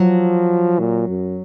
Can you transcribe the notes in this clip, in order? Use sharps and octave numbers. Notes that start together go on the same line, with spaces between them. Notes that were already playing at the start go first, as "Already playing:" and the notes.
Already playing: F3 F#3
A#2
F#2